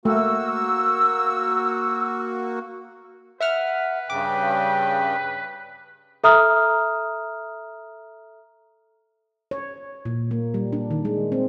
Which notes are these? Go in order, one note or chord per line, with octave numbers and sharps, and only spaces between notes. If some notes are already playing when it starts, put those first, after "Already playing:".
A3 A#3 F#4 E6
B4 E5 F#5 F6
G2 C#3 G5 D6
A4 E5 A#5 D#6 F6
C#5
A#2
A#3
G3
D4
D#3
G#3
C4